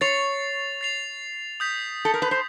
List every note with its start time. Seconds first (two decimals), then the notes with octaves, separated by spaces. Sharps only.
0.01 C#5 A6 C7 F7
0.81 A6 C7 F7
1.60 D#6 G6 B6
2.05 A4
2.14 A#4
2.22 B4
2.31 C5